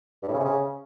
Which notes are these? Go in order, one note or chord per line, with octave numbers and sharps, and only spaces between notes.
G2
A2
C#3
C3
C#3